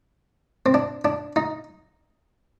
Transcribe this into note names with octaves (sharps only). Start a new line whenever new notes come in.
C4
D4
D4
D#4